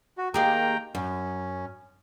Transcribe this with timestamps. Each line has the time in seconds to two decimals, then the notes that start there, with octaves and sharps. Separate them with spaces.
0.18 F#4
0.34 D#3 A#3 G4 G#4 G5 A#5
0.95 F#2 C#4